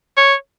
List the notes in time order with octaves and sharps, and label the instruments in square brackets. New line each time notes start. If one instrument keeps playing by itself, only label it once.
[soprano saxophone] C#5